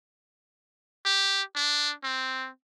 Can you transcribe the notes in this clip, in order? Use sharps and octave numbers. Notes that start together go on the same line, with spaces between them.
G4
D4
C4